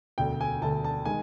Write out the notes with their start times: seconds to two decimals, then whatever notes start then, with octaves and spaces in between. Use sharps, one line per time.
0.18 E1 D2 D3 G5
0.41 G#5
0.62 E1 D2 D3 A5
0.84 A5
1.05 D#3 G#3 G#5